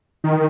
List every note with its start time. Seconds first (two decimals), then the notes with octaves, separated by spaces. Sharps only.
0.24 D#3